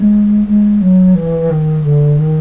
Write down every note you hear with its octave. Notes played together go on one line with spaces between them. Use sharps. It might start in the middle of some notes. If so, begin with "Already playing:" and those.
Already playing: G#3
G#3
F#3
E3
D#3
D3
D#3